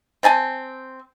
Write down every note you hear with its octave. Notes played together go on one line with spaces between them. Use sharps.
C4 D5 G#5 A5